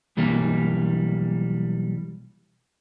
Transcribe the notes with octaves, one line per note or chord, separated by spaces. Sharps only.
B1 E3 G3 A#3